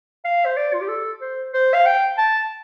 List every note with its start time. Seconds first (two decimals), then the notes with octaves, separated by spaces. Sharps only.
0.25 F5
0.45 C5
0.57 D5
0.73 F4
0.81 G4
0.88 A4
1.21 C5
1.53 C5
1.74 F5
1.86 G5
2.18 A5